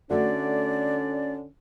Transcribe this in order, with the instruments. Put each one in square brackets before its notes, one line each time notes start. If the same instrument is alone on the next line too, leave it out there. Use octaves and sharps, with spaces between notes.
[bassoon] D3 [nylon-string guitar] A3 F#4 [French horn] C#4 [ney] D5